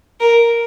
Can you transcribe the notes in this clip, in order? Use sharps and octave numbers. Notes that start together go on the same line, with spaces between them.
A#4